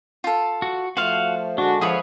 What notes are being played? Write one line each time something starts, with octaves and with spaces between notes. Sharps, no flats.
F4 A4
F#4
F3 A3 F4 F#4 C5 F5
D3 G#3 D4 F#4
F3 F4 G#4 B4 C#5 E5 D#6